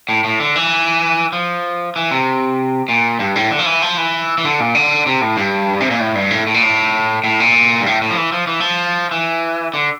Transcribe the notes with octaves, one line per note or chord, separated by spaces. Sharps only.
A2
A2
D3
E3
F3
E3
C3
A#2
G2
A2
D3
F3
E3
F3
E3
E3
D3
A#2
D3
C3
A2
G2
C3
A#2
A2
G2
A2
A2
A#2
A2
A2
A#2
G2
A2
A2
F3
E3
F3
E3
F3
E3
D3